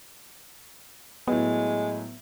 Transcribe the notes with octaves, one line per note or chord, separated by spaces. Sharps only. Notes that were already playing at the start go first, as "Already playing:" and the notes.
A2 F#3 G#3 B3